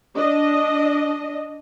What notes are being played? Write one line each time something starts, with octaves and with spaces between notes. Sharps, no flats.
D4 D#5